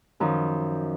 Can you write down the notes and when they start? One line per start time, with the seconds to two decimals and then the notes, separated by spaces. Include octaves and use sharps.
0.20 F#2 D#3 F3